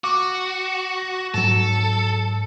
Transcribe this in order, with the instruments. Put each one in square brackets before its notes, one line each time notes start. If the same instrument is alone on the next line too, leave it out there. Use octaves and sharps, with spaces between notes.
[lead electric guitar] F#4 [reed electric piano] D6
[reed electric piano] G#2 F#3 [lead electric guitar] A4